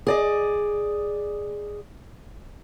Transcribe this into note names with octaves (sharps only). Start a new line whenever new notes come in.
G#4 D5 D#5